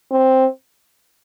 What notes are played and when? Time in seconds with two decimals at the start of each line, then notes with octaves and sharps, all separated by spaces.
0.11 C4